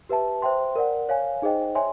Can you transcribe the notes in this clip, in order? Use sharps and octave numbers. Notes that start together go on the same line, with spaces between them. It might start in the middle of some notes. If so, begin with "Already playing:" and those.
G4 B4 E5 A5
C5 E5 G5 C6
A#4 D5 F#5
C#5 F5 G#5
D#4 G#4 C5 D#5 G5
C#5 E5 G#5 C6